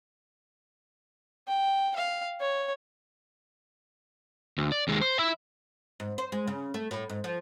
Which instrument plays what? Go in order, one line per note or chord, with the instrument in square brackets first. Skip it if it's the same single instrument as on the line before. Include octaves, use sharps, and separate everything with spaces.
[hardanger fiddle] G5
F5
C#5
[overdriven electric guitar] D2
D5
D#2 G#3
C5
E5 B5
[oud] G#2
C5
G#3
C#3
A3
A2
G#2
F3